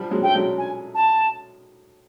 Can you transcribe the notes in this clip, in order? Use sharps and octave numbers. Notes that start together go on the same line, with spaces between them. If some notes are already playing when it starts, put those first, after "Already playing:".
Already playing: F3 G3
F#3 G#3
A3 G5
F#3 G#3
G#5
A5